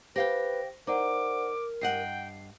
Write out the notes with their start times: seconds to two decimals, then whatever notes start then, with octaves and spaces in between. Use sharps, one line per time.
0.16 G4 B4 C5 F5 G5 A#6
0.87 D#4 A#4 C5 D5 F#5 D6
1.81 G2 D#5 F#5 G5 C7